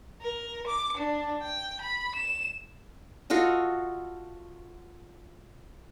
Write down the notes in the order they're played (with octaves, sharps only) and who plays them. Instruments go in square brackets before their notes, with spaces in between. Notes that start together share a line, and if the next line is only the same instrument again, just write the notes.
[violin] A#4
D6
D4
G5
B5
E7
[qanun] F4 F#4 A4 D#5